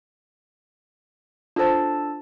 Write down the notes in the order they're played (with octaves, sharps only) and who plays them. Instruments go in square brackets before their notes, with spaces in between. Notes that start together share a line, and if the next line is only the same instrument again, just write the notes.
[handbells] D4 A4 A5 [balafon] F4 C5